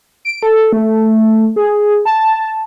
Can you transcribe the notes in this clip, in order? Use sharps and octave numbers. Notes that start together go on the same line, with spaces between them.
D7
A4
A3
G#4
A5